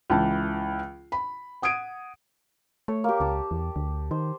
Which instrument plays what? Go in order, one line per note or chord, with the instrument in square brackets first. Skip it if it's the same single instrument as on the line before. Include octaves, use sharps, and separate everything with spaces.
[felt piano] C#2 E3 A5
B5
F#5 D#6 G#6 D7 D#7
[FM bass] A3 [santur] C#5
[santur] A#3 G4
[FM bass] C#2 [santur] A5 D6
[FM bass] E2
D2
[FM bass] D#3 [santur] C5